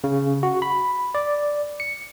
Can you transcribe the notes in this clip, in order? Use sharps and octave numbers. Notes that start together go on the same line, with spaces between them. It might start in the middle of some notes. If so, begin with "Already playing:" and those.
C#3
F#4
B5
D5
C#7